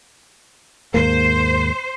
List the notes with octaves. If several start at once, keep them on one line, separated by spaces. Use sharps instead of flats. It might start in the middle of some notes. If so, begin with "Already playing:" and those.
D#2 G#2 A#3 C5